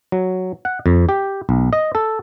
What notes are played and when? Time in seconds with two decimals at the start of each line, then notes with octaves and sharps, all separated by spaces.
0.12 F#3
0.65 F#5
0.86 F2
1.09 G4
1.49 B1
1.73 D#5
1.95 A4